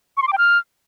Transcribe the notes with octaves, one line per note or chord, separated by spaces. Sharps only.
C#6
C6
D6
G5
F6